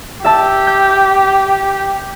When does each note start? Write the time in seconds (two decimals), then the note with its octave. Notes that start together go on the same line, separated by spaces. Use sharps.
0.25 G4 E5 A5 E6
0.67 G6